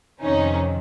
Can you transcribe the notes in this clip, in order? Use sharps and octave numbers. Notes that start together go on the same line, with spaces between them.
F2 C3 D#3 C#4 D#4